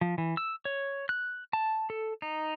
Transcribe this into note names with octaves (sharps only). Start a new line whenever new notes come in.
F3
E3
E6
C#5
F#6
A5
A4
D#4